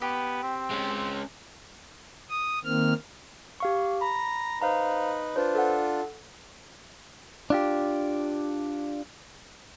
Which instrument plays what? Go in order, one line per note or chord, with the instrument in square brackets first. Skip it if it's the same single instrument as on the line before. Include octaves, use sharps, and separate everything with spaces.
[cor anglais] B3 [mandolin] G4
[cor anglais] C4
[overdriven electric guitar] G#3 C#4
[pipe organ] D#6
D#3 A#3 C4 F6
[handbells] G4 F5 C#6
[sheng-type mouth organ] A#5 [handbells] B5
[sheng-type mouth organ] D#4 B4 [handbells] C5 F5 A#5
[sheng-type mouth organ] D4 F4 [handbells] B4 C5
[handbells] A4 F#5
[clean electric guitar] D4 F4 G4